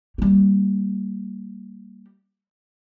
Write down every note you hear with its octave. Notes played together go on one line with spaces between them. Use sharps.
G3 A#3